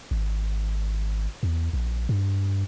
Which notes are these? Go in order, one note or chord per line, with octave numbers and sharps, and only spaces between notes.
G#1
E2
A#1
G2